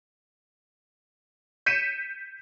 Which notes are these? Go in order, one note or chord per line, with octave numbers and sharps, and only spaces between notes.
G6 B6 C#7 D#7 E7